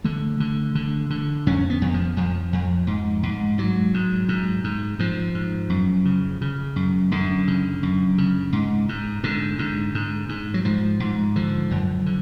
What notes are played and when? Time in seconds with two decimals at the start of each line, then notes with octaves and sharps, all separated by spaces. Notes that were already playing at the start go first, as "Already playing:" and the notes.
0.04 D3 A3
0.40 D3
0.75 D3
1.10 D3
1.46 F2 C#4
1.70 B3
1.82 F2
1.94 F3
2.17 F2 F3
2.53 F2
2.87 G#2
3.23 G#2
3.58 G#2 F#3
3.94 G#2
4.29 G#2
4.64 G#2
4.99 G#2 F3
5.35 G#2
5.70 F#2
6.05 C#3
6.41 C#3
6.76 F#2
7.11 F#2 D3
7.47 C#3
7.83 F#2
8.18 C#3
8.53 G#2
8.89 G#2
9.23 G#2 D3
9.59 G#2
9.95 G#2
10.29 G#2
10.54 F#3
10.65 G#2 F3
11.00 G#2
11.36 D3 F3
11.71 F#2
12.06 D3